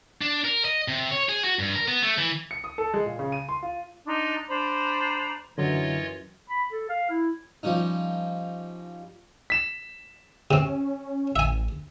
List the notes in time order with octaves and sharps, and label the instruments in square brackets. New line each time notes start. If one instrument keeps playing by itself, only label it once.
[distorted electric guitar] D4
A#4
D#5
C3
C#5
G#4
F#4
G2
A#4
B3
A3
E3
[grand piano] C#7
D#6
A4
G#3
A#2
C#3
D#7
C6
F4
[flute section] D4 D#4 C6
D4 C5 A#5 B5
[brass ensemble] F#2 E3 [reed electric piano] D3 F#3 [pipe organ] F4 C#5 D#5
[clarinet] B5
A4
F5
E4
[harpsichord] F3 G3 C#4 D#4
[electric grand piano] B6 E7
[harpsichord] C3 C4 [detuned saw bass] C#4
[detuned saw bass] A1 [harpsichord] E5 G#5